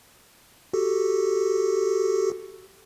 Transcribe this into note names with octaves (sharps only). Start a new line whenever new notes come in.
F#4 G4 A4